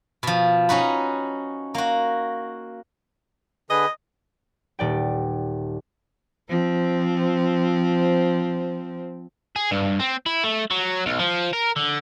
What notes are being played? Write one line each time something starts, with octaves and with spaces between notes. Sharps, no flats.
B2 F3
C#4 D#4 F#4 B4
A#3 F#4
D3 G#4 B4 D#5
D#1 D5 G5
F3 C4
G#4
G2
C4
E4
A3
F#3
B1
F3
A#4
D3